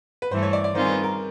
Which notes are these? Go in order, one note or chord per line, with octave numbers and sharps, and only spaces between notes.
B4
G2 E3 A3 C5
C#5
D5
D5
D#3 G3 C4 F4 G#4 C5
B4
A#4